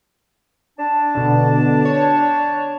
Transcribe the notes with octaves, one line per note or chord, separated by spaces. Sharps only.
D4 A5
B2 D3
C#5